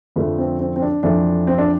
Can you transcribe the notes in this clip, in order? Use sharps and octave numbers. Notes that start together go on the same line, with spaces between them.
F2 D3 F3 A3 B4
C4
C4
C4
D4
F2 E3 A3 D4
C4
D4